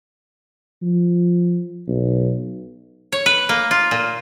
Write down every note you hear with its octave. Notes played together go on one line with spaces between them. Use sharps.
F3
B1
C#5
B4
A#3
F4
A#2